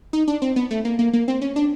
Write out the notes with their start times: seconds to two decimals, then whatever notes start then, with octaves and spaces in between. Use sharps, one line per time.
0.13 D#4
0.28 D4
0.42 C4
0.56 B3
0.71 A3
0.85 A#3
0.99 A#3
1.13 A#3
1.28 C4
1.42 C#4
1.56 D4